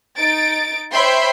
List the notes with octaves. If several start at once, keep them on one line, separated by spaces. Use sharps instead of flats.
D#4 A6 D7
C5 C#5 E5 G5 B5 C6